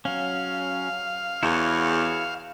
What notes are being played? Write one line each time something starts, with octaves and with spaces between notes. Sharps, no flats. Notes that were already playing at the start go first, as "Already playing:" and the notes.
F#3 C#4 F5
E2 E4 F#4 C#5